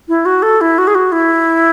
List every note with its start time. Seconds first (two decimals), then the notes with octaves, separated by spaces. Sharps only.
0.08 E4
0.26 F#4
0.42 A4
0.61 E4
0.78 F#4
0.87 G#4
0.95 F#4
1.12 E4